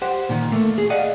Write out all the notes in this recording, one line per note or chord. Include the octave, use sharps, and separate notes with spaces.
G4 C5 F#5
A#2 D#3
A3 A#3
G#4
D5 D#5 F5 F#5